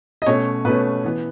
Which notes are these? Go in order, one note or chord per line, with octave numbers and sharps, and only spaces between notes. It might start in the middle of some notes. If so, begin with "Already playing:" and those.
D#5
B2 A3 C#4 C#5
B2 A3 C#4 B4
E3 B3